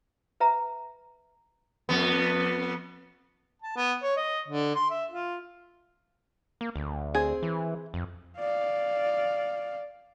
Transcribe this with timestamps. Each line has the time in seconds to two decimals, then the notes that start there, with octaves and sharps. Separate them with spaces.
0.40 B4 E5 A#5
1.89 F2 B3
3.62 A5
3.76 B3
4.02 C#5
4.17 D#5
4.48 D3
4.75 C6
4.90 E5
5.11 F4
6.61 A#3
6.76 D2
7.14 C4 G#4
7.42 E3
7.94 F2
8.38 D5 F5